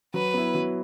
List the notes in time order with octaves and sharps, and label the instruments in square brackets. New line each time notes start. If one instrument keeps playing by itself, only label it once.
[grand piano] F#3 [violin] B4
[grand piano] B3 E4
F#3